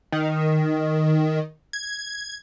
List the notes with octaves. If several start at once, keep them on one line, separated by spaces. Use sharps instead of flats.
D#3
G#6